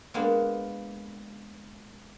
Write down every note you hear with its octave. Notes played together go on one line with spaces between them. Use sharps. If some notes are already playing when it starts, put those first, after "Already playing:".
G#3 A#3 B3 D4